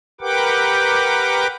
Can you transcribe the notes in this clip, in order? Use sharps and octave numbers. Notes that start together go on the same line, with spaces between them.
G4 A#4 B4 F#5 G5 D6